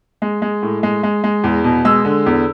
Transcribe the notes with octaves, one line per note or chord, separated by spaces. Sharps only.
G#3
G#3
A2
G#3
G#3
G#3
E2
B2
G#3 E6
D3
E2